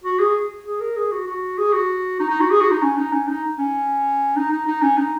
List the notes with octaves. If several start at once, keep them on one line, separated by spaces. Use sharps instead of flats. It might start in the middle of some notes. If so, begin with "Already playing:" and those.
F#4
G#4
G#4
A#4
G#4
F#4
F#4
G#4
F#4
D#4
D#4
F#4
G#4
F#4
D#4
C#4
D#4
C#4
D#4
C#4
D#4
D#4
D#4
C#4
D#4